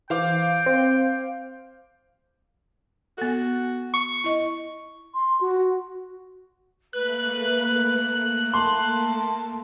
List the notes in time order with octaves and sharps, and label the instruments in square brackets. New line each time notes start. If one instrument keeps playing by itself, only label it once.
[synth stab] E3 [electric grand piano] C5 F5 D6 [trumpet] G5
[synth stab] C4
[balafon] B3 A4 [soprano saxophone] F#4
[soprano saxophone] C#6
[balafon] E4 D#5
[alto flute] C6
F#4
[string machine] A3 A#3 [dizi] B4 [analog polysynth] F#6
[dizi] A5 [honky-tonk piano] C6